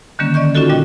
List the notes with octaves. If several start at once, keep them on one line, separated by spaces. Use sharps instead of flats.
D3 D#3 G3 A#3 C#4
D5 D#5 C#6 G6
C#4 D#4 F4 F#4 A4
A#2 G3 D#5 G5